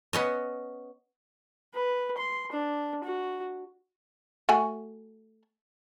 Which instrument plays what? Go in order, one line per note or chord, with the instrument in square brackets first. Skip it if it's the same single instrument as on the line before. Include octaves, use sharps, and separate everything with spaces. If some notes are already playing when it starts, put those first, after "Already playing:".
[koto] B3 C#4 D#5
[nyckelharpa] B4
C6
D4
F#4
[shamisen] A3 F#4 G#5